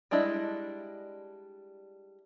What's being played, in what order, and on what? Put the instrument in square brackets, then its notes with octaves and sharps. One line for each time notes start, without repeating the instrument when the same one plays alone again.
[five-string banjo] G3 G#3 D4 E4 D#5